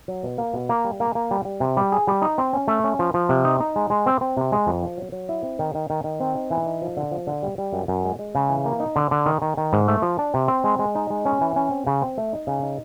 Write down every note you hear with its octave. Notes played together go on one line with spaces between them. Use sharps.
F#3
B2
A#3
B2
A#3
G3
A#3
A#3
G3
G3
C3
G3
G#4
G3
D#4
C4
C#4
A3
C#4
F3
F3
C3
D#4
D#4
G#3
G#3
C4
C4
C3
G#3
F2
F3
F#3
F#3
E4
C4
D#3
D#3
D#3
D#3
C4
D#4
E3
D#4
F3
D3
F3
D3
G3
G3
F#2
F#2
G#3
G#3
C#3
E3
A#3
D#4
D3
D3
D#3
D#3
D#3
G#2
A3
F3
D4
C3
C4
G#3
G#3
D#4
G#3
C#4
E3
C#4
C4
C#3
C4
A3
D#4
C#3
D#4